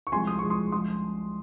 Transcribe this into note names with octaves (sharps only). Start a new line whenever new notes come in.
C#6
C2 C3 F3 G#3 G#5 C6
D#6
C2 C3 F3 G#3 C#6
C6 D#6
F3 G#3 C6 D#6